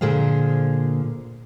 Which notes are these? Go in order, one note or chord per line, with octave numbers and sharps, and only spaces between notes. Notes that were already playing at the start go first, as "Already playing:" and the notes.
A#2 D3 G#4 C5 F5